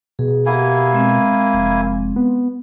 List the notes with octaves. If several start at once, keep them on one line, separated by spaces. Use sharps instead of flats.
B2 G#4
A#3 E4 G4 F#5 G#5
G#3 C4
F1
B3